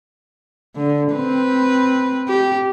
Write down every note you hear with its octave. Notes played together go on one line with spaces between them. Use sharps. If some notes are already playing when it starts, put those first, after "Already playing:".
D3
C4 B4
G4